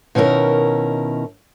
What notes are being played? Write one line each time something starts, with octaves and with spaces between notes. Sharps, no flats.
B2 D#3 C#4 E4 A#4